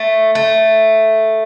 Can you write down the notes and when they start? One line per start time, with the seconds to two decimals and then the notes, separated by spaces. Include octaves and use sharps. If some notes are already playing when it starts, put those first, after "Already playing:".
Already playing: A3
0.35 A3